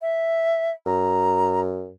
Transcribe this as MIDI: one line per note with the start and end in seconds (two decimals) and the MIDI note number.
0.01 0.71 76
0.86 1.91 42
0.86 1.60 82